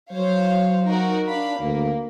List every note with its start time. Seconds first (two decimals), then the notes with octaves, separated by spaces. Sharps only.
0.12 F#3 C5 C#5 F5
0.86 D#4 F#4 A#4
1.28 D4 F5 B5
1.61 D2 A#3